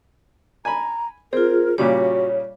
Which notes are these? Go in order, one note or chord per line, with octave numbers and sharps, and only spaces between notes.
G#5 A#5 B5
C4 F4 G#4 A#4
A#2 C#3 G3 F#4 C#5